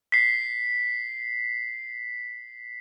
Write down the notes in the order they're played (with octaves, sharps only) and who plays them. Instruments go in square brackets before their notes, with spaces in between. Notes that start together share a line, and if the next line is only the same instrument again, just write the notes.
[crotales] B6 C7